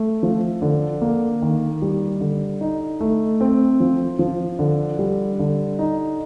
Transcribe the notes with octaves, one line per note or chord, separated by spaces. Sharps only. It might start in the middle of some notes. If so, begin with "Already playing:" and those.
Already playing: A3
F3
D3
A#3
D#3
G3
D3
D#4
A3
C4
F3
F3
D3
G3
D3
D#4